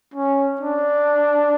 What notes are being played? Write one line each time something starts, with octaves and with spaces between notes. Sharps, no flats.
C#4
D4